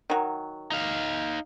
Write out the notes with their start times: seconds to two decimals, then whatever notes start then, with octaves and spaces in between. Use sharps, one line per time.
0.10 D#3 F#3
0.72 D#4 F5